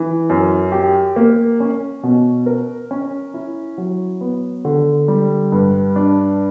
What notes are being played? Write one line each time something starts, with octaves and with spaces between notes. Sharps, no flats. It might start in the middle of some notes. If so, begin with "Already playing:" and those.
Already playing: E3
F#2
G4
A#3
C#4
B2
A#4
C#4
E4
F#3
B3
D3
G3
G2
D4